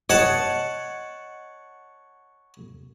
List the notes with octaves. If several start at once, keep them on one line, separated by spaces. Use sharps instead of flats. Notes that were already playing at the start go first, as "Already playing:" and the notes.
C#5 D#5 F#5 A5